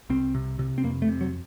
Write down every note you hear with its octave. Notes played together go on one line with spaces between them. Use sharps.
C2 C4
C3
C3
C4
F2 A#3
A3
C3
F#3